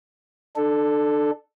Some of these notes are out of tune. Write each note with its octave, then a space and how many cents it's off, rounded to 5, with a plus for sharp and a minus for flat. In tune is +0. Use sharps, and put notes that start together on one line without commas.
D4 +25 A4 +0